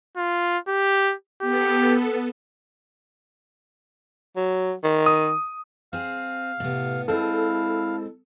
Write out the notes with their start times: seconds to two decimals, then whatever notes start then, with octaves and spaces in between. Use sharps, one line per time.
0.17 F4
0.68 G4
1.42 B3 G4 A4
4.36 F#3
4.84 D#3
5.06 D#6
5.93 C4 G#4 F5
6.60 A2 C3 B3
7.08 G#3 C4 E4 A4 F5